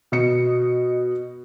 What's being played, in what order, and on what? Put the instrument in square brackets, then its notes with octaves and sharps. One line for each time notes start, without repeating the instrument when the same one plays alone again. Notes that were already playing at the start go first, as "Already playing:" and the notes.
[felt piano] B2 D#5 C#7